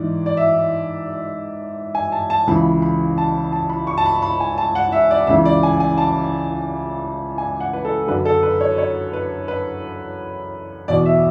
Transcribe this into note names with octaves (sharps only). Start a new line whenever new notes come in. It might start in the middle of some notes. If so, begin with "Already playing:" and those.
Already playing: G#2 E3 D5
D5
E5
G#5
A5
A5
C#2 C#3 E3 B5
B5
A5
A5
B5
C#6
A5
B5
B5
G#5
A5
F#5
E5
D5
C#2 C#3 E3 E5
D5
G#5
G#5
A5
G#5
F#5
B4
A4
F#2 D3 B4
A4
B4
C#5
C#5
B4
B4
E2 B2 D5
E5